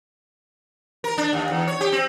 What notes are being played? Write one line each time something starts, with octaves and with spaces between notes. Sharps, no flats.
A#4
D4
D#2
E2
C#5
G4
C4